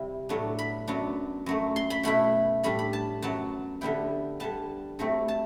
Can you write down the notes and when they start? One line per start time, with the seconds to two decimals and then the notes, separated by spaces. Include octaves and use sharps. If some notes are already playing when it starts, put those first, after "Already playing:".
Already playing: C3 G3 C4 E4
0.29 A2 F#3 B3 D4
0.59 B5
0.88 F#2 F#3 B3 D4
1.46 F#2 F#3 A3
1.76 C6
1.90 B5
2.03 B2 A3 E4 B5
2.63 A2 G3 D4 B5
2.79 B5
2.93 A5
3.22 F#2 F#3 B3 A5
3.81 D3 G3 B3 E4 G5
4.40 D3 G3 B3 A5
4.99 G2 F#3 A3 C4 E4
5.28 A5